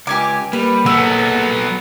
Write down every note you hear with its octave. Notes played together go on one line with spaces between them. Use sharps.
C#2 G4 G#5 D6
G3 A#3 B4
F#3 B3 G#4 A4 E6